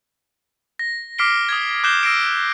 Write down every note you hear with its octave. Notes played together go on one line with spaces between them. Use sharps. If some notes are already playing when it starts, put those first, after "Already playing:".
A#6
D6 F6 B6 C7 D7 G7
D#6 G#6
D6 F#6 G6 C7 E7 G7
E6 A#6 C7 D7